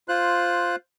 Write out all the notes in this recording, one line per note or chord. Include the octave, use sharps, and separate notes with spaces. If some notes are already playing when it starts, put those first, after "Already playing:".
F4 C5 F#6